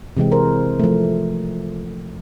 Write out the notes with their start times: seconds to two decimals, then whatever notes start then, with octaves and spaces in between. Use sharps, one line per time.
0.17 C3 E3 G#3 C4
0.32 A#4 C5
0.79 F3 A3